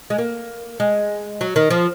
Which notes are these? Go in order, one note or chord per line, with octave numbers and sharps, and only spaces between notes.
G#3
A#3
G#3
F#3
D#3
F3